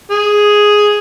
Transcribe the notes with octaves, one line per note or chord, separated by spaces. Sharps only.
G#4